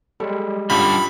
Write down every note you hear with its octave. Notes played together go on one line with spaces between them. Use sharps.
G3 G#3 A4 C#5
G2 D3 C#4 F4 G4 B5